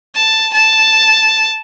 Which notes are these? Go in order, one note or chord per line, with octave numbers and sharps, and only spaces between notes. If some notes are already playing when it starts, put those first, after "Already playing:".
A5
A5